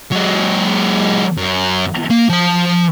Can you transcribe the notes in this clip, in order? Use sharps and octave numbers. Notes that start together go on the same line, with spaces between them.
F#3 G#3
F#2
A#3
F3 A5